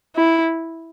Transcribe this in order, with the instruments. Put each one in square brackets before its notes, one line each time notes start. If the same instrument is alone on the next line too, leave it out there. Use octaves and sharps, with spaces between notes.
[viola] E4